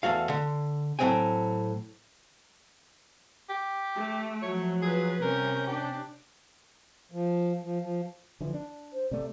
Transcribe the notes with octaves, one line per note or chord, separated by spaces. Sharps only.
E2 A3 F#4 F5
D3
A2 F#3 B3 C4 G5 G#5
G4
A3
F3 F#3 C#5
F4 G#4 B4
C3 G3 C#4 A#4 G6
D4 G4
F3
F3
F3
D3 E3 F3
D4
C5
C3 A3 D5